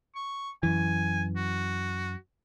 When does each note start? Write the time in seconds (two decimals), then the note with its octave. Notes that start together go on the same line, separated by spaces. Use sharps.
0.16 C#6
0.63 F#2 E3 G#5
1.36 F#4